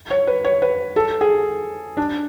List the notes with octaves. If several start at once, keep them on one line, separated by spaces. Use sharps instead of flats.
C#5
B4
C#5
B4
A4
G#4
D4